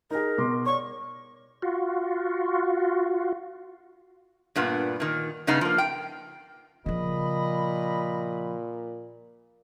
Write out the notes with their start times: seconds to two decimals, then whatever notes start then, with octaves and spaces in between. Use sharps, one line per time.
0.11 D#4 G#4 A#4
0.38 B2 C6 D6
0.66 C#5 D5 C#6
1.62 F4 F#4
4.56 G2 A#2 B3
5.00 A#2 D#3
5.47 G2 C#3 B3 D#4
5.61 F3 A#3
5.78 G5
6.86 A#2 C#3 F3 D#5 B5